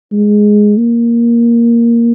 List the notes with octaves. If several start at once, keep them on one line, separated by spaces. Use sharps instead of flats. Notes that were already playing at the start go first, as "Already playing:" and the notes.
G#3
A#3